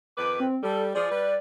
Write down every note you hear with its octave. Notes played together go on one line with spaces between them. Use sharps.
F2 D#3 B4 D6
C4
G3 A4
F3 G#4 D5
G3 B4